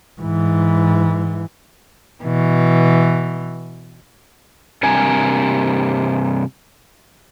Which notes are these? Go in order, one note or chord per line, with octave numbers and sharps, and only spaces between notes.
G#2 E3
B2 E3
G2 C3 A#4 G#5